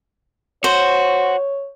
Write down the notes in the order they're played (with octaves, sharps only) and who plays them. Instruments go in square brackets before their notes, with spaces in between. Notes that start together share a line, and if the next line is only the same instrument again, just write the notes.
[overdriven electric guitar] F#4 [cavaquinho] C5 [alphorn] C#5